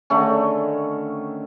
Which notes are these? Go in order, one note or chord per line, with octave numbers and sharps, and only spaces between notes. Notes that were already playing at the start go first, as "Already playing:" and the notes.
D3 D#3 A3 C#4